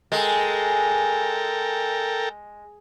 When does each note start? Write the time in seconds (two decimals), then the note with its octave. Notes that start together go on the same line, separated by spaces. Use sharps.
0.12 G#3 A4 A#4 G5